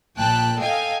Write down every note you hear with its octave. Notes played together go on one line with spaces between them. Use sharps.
A#1 A#2 G5 A5 F#6
A4 D#5 F5 G5 G#5